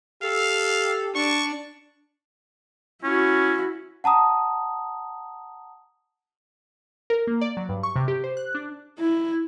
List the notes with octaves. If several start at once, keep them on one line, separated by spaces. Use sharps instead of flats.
G4 A4 F5
D4 C#6
C#4 E4 F#4
F#5 A5 A#5 D#6
A#4
A#3
D5
F#3
G2
C#6
C3
G4
C5
F#6
D4
E4